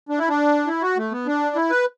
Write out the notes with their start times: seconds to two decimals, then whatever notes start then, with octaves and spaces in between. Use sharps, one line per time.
0.09 D4
0.19 E4
0.28 D4
0.67 E4
0.82 F#4
0.97 A3
1.12 B3
1.26 D4
1.56 E4
1.70 B4